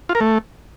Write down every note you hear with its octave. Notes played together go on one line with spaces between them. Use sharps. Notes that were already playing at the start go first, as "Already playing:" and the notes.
F4
A#4
A3